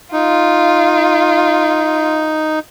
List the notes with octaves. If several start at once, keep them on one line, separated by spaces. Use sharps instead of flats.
D#4 F4